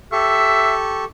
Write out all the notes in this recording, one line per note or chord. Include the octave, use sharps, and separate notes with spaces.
G4 A4 E5 C#6